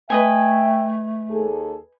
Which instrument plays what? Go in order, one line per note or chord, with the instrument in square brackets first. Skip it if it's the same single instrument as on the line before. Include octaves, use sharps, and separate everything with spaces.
[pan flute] A3 [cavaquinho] B4 D#5 G#5 [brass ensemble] E5 G5
[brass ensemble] D#2 G#4 A4